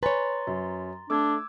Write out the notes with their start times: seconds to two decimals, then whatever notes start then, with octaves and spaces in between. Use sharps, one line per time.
0.03 B4 C#5 G#5 A#5 C6 A6
0.47 F#2
1.10 A3 D4 D6 E6 G#6